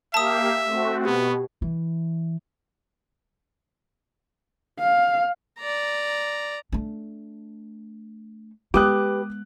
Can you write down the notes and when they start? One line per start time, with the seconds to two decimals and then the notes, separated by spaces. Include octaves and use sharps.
0.14 A#3 G4 E5 F5 A5 D#6
0.65 A3 C4 F#4
1.05 B2 B3 G4
1.62 E3
4.80 F5
5.59 D5 A#5
6.72 A3 D4
8.74 G#3 B3 G4 B4 D6 D#6 F#6